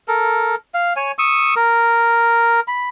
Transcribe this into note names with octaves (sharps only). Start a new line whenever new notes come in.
A4 A#4
F5
C#5 G#5
C#6 D#6 E6
A#4
B5